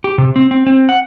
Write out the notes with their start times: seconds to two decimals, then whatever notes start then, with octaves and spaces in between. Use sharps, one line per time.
0.04 G4
0.18 C3
0.36 C4
0.51 C4
0.67 C4
0.89 F#5